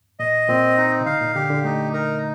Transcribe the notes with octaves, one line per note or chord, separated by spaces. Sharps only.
A#2 D#5
A#2 C4
D#4
C3
D3 F5
A#2
D3 G4
D3
A3 D#4
A#4